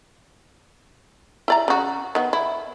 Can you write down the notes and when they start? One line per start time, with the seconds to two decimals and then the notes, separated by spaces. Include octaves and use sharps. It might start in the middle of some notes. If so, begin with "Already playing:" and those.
1.48 E4 D5 A#5
1.68 C#3 F#4
2.15 D#3 B3
2.33 E4